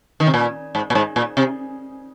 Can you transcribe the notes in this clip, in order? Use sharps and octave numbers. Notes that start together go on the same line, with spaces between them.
D#3
C3
A#2
G#2
A#2
G#2
A#2
C3